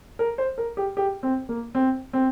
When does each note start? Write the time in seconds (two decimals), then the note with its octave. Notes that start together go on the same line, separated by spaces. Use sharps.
0.19 A#4
0.38 C5
0.58 A#4
0.77 G4
0.97 G4
1.23 C4
1.49 A#3
1.75 C4
2.13 C4